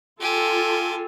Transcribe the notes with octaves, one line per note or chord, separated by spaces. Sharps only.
F4 G4 A4 G#5